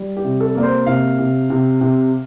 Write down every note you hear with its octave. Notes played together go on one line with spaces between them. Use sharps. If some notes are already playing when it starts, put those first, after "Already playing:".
Already playing: G3
G4
C3
A4
A#3 D5
C5
C3 F5
C3
C3
C3